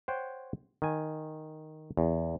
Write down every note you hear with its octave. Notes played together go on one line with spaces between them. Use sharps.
C5 C#5 F#5 G5
D#3 G#5
E2